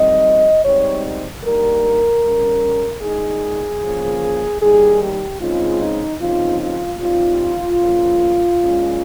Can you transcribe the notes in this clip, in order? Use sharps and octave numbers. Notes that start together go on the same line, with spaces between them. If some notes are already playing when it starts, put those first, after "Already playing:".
Already playing: F2 D#3 G3 C4 D#5
G#2 G3 C4 D#4 C#5
G2 G3 A#3 D#4 A#4
C#3 G3 C#4
A#2 G#3 D#4 G#4
C#3 F3 A#3
D#2 D#3 G3 G#4
G4
C#3 G#3 C4 D#4 F4
D#4
D#2 C#3 F3 C4 D#4 F4
F4
C3 G3 C4 D#4 F4
C#3 F3 A#3
A#2 G#3 C#4